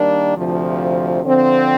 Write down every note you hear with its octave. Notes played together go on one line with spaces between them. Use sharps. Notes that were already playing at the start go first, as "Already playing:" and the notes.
Already playing: D#3 G3 A#3 D4
D2 C3 F3
D3 F3 C4